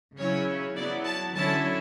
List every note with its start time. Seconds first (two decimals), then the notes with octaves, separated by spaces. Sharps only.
0.18 C#3 F#3 C#4 E4 C#5
0.76 F#3 B3 E4 D5
1.05 A5
1.35 D3 F#3 C#4 E4 A5